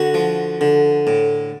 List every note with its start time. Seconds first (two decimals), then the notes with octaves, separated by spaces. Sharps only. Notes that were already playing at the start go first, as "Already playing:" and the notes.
Already playing: D3 F#4
0.14 F3
0.61 D3
1.07 A2